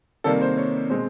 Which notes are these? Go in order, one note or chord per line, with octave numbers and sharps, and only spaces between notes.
C3 D#3 G3 A#3 A4
C5
C#5
B2 G#3 C4 C5